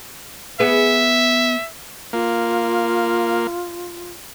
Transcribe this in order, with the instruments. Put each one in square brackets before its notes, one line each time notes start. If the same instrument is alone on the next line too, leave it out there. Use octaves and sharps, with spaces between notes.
[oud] B3 G#4 B4 [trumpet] E5
[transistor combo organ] A#3 [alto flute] F4